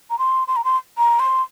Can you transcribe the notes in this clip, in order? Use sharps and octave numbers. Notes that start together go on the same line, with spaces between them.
A#5
C6
C6
A#5
C6
A#5
C6